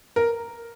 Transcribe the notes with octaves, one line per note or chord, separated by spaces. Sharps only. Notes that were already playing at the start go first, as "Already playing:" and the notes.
A#4